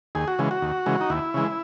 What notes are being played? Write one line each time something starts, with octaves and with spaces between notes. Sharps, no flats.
D#2 G#4
F#4
C#3 E3 G#3
F#4
D#2
C#3 E3 G#3
D#4
D#2 E4
C#3 E3 G#3